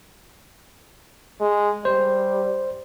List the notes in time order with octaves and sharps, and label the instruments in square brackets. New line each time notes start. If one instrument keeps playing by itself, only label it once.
[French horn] G#3
[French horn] G3 [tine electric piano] C5